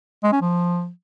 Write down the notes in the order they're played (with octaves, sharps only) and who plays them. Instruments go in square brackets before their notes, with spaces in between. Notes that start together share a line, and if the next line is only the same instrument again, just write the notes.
[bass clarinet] G#3
C#4
F3